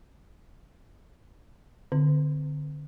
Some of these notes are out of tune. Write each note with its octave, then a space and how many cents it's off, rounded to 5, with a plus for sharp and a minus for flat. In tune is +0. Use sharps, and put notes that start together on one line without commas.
D3 +10 C4 +0